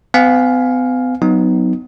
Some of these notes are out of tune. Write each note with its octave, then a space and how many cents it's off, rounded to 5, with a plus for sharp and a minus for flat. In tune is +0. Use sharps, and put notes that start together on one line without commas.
B3 +45 F5 +10 G#5 +0
F#3 +0 B3 +25 D#4 +0